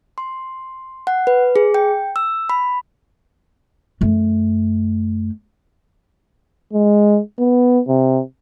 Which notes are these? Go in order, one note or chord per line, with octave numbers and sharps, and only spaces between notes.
C6
F#5
B4
G#4
G5
E6
B5
F#2 A3
G#3
B3
C3